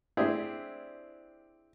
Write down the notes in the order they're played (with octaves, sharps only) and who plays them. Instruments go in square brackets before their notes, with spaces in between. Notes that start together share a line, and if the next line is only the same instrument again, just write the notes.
[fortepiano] C4 D4 E4 G4 G#4